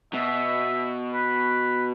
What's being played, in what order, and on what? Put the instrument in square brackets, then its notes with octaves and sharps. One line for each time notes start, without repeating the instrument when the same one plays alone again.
[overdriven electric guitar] B2 [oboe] E5
[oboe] B4